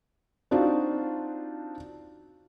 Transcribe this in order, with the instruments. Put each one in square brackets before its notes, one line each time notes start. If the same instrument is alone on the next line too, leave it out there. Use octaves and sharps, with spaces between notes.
[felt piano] C4 D4 D#4 F4 F#4